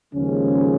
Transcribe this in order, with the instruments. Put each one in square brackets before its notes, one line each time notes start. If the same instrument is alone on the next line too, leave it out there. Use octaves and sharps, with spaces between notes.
[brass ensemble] D#2 C#3 F3 G#3 C#4